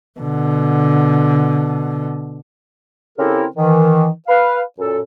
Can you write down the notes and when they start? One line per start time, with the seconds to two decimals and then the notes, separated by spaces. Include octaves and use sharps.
0.19 B2 D3
3.18 C#3 C4 E4 G4 A4 A#4
3.56 D#3 E3
4.28 B4 F5
4.79 F#2 A#2 A4